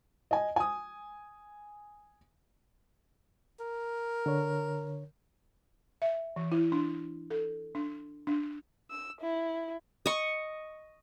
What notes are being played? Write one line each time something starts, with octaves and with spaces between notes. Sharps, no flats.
D#5 G#5
G#5 D#6
A#4
D3 C#5
E5
E3
E4
D4
A4
D4
D4
E6
E4
D#5 C#6